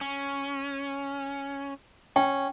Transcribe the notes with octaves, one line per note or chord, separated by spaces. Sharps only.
C#4
C#4 G5